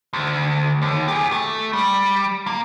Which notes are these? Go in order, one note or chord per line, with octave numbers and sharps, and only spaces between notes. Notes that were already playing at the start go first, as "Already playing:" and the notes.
D2
D#2
G4 G#4
A3
G3
A#3